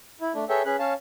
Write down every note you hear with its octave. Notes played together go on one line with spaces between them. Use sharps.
E4
A3 D4
G#4 A4 B4 C#5 E5 G5
C#4 G#4 B4 F#6
C#4 C#5 F5 A5